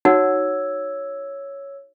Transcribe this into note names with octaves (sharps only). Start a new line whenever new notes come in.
D#4 F#4 C#5 F#5 E6 G#6